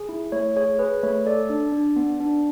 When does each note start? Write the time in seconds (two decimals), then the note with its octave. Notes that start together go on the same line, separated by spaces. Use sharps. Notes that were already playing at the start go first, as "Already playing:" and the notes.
Already playing: G#4
0.09 E4
0.32 A3 C#5
0.56 G#4 C#5
0.79 G#4 B4
1.03 A3 C#5
1.25 A4 D5
1.49 D4
1.72 D4
1.96 B3
2.20 D4